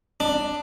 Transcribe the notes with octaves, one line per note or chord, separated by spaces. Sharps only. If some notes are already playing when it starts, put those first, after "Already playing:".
D4